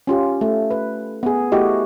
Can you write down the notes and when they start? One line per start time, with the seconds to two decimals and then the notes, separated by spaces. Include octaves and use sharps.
0.07 C#4 F4 G4
0.41 A3
0.71 B4
1.23 B3 G#4
1.52 A3 E4 F#4 G4 D#5